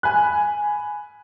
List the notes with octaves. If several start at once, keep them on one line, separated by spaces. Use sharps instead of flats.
G#5 B5 F#6